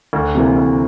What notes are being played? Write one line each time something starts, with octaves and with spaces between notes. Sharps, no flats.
D2
C3 E3 A#3
D2